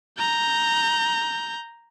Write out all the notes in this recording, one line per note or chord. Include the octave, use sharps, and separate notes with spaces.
A#5 G6